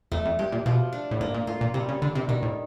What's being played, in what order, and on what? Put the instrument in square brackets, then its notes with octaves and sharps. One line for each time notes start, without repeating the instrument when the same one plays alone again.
[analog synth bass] F2 [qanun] A3
[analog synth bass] F2
[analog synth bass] G2 [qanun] G4
[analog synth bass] A#2
[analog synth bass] B2 [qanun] F3
[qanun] D4
[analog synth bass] A2
[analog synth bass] G#2 [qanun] A#3
[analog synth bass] A#2
[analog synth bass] A2 [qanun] F4
[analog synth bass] A#2
[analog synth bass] C3 [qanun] G3
[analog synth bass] C#3
[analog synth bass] D3 [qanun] D4
[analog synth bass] C3
[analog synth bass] B2 [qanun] D#3
[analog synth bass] A2